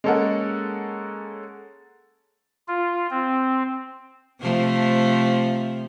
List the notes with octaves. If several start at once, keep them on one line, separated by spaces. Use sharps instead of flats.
G#3 A#3 C#4 A4 A#4 F#5
F4
C4
C3 F3 A3